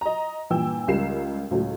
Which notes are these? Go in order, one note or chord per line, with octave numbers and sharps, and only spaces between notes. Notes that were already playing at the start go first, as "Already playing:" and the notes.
D#5 A#5
G2 A#2 E3 G5 E6
C#2 G3 A#4 C7 E7
C#2 A2 F#3